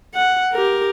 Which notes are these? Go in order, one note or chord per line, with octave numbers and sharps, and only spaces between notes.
F#5
G4 A#4